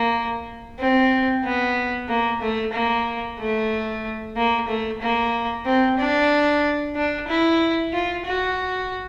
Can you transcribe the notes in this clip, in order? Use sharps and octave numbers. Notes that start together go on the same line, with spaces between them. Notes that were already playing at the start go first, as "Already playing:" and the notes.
Already playing: A#3
C4
B3
A#3
A3
A#3
A3
A#3
A3
A#3
C4
D4
D4
E4
F4
F#4